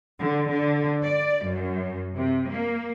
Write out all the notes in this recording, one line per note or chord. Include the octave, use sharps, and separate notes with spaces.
D3
D3
D5
F#2
C3
A#3